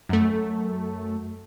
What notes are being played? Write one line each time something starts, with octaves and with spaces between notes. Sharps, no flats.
F#2 A3